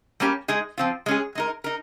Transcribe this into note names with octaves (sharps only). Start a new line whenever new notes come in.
G3 A#3 C#4 G4
G#3 D#4 G#4
F3 C4 F4
G#3 C#4 G#4
G#3 D#4 A#4
D#4 A#4